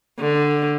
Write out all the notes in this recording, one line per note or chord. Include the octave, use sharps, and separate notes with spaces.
D3